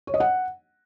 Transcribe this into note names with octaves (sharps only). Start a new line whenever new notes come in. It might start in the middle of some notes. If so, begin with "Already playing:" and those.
C#5
D#5
F#5